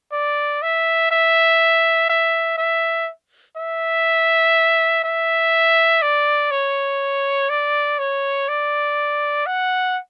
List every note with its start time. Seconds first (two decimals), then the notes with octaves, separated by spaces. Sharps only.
0.12 D5
0.62 E5
1.11 E5
2.09 E5
2.58 E5
3.56 E5
5.04 E5
6.02 D5
6.51 C#5
7.50 D5
7.99 C#5
8.48 D5
9.46 F#5